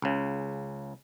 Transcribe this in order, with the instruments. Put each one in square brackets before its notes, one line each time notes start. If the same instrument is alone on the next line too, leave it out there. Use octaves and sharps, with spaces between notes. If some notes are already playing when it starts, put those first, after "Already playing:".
[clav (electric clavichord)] C#2 C#3